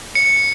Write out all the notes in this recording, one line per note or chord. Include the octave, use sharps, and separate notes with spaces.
C#7